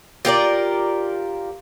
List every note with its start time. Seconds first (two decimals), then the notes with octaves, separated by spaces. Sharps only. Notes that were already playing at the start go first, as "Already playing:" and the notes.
0.25 F4 G4 A#4 D5